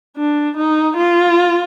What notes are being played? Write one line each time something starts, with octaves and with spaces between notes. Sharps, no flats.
D4
D#4
F4